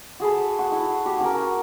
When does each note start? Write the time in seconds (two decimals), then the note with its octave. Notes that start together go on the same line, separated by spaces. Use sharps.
0.20 F#4 G#4 A4 B5
0.59 F#4
0.72 E4
1.05 F#4 G4
1.20 C#4 F#4 A#4